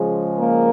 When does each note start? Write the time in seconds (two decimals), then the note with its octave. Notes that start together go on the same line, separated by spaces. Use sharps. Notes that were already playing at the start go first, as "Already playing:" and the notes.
Already playing: C#3 F3 G#3
0.38 A#3 A#4